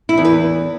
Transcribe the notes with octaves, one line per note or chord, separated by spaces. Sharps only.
E4
E2
B4